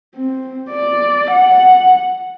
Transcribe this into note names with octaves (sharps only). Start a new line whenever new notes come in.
C4
D5
F#5